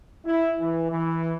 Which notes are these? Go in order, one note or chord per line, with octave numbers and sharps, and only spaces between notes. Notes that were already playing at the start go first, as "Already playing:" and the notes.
E4
E3
E3